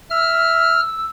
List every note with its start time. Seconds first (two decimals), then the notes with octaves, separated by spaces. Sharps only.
0.10 E5 E6 F6